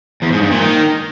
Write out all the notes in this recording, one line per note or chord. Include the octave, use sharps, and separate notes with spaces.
E2
G#2
G2
A#2
D#3